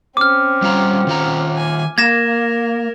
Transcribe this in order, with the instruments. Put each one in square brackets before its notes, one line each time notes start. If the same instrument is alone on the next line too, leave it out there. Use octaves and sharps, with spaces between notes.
[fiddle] C4 C#4 [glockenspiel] D6 F6
[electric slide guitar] G3 F4 A#5
D#3 F4 A#5
[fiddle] G#5
[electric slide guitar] A#3 [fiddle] A#4 [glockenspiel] G#6 A#6 E7